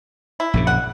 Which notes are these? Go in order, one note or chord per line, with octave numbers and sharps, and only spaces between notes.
E4
A#1 F#2 C#3
G3 F#5